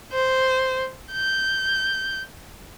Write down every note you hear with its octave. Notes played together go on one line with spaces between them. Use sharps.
C5
G6